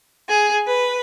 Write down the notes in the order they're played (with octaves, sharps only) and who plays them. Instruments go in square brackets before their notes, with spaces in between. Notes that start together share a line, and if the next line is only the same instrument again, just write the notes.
[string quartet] G#4
B4